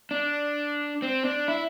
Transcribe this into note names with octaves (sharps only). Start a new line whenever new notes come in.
D4
C4
D4
E4